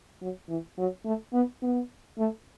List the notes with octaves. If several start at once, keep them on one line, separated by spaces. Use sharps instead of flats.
F#3
E3
F#3
A3
B3
B3
A3